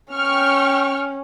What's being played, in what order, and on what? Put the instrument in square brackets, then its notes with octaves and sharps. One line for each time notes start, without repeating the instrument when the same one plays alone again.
[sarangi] C#4 [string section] G5 C#6 F6